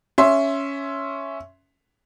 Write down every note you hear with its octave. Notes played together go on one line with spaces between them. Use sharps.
C#4 E5 C6